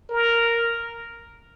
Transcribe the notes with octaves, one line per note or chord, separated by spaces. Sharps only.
A#4